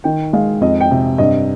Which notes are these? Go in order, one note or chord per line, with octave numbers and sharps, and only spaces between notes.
D#3 G5
G#3 F5
F2 D#5
G5
C3
G2 D#5